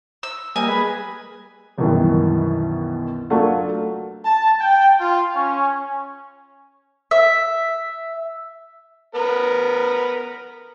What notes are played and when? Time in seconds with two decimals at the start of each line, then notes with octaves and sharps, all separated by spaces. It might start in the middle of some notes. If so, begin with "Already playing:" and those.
0.23 E6
0.56 G3 A#3 D#5 G#5
0.68 G#4 B4
1.78 C2 F#2 B2 D#3 E3
3.30 F#3 A3 D4 F4 A#4 F#5
4.26 A5
4.61 G5
5.00 F4
5.36 C#4
7.11 E5
9.15 B3 A#4